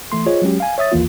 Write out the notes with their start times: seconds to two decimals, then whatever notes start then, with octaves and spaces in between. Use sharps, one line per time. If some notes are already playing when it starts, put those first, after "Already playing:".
0.12 E3 A3 C6
0.26 F4 G#4 C5 C#5 D#5
0.42 F#3 G#3 C#4 G4
0.60 F5 G#5
0.78 C#5 E5 D#6 A6
0.92 G#1 D#2 E3 A#3 F4